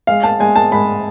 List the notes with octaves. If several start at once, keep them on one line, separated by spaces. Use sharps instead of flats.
G#3 F5
A5
G#3 G#5
A5
G#3 B5